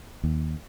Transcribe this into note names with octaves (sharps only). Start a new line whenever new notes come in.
D#2